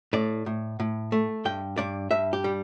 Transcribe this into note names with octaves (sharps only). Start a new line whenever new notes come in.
A2 D5
A2
A2
A3
G2 G5
G2 D5
G2 E5
G4
G3